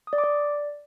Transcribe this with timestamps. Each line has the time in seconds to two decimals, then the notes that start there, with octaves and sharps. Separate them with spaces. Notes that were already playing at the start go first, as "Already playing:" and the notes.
0.07 D#6
0.13 D5
0.18 D6
0.24 D5